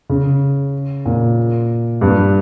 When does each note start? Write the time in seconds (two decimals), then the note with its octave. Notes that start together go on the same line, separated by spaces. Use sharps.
0.09 C#3
1.06 A#2
2.01 G2